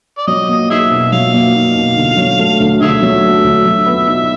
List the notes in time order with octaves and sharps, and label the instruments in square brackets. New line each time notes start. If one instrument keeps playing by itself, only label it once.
[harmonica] D5
[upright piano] F#3 [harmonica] D#5
[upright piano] A#3
[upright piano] D#4 [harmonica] G#4 E5
[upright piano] B2
[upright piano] F#3 [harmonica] F5
[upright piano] A#3
D#4
B2
D3
F#3
A3
D2
[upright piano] D3 [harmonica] G#4 E5
[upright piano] F#3
A3
D2
F#3
B3
D#4